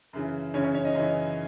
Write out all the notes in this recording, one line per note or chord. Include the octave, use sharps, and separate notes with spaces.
F#2 C#3 E3
F#2 C#3 E3 C#4 C#5
C#4 C#5
C#4 C#5
D#4 D#5
F#2 C#3 E3 D#4 D#5